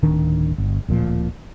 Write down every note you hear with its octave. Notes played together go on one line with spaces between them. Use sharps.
D1 D#3 D4
G1
D1 A#2 F3